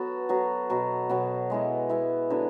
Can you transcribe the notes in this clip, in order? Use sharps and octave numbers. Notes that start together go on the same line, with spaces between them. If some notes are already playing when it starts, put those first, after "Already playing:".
Already playing: F#3 B3 F#4 A4
F#3 B3 F#4 A4
B2 F#3 B3
B2 F#3 B3
G#3 B3 E4
G#3 B3 E4
D3 F#3 B3 E4